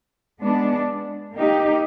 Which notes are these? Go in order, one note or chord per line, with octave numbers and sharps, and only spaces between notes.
G#3 B3 D4
A#3 D#4 G4